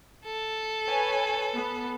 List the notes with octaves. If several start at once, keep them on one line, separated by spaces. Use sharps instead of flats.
A4
B4 C#5 G#5
B3